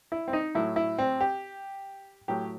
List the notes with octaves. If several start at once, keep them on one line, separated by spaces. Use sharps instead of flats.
E4
C4
D#4
A2 F#3 E4
E4
C4
G4
A2 F#3 G4